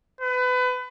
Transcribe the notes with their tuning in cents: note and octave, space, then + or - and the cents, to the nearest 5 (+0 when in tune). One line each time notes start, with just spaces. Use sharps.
B4 +30